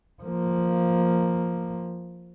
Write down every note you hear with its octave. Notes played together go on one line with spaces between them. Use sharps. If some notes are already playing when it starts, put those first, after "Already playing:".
F3 A#3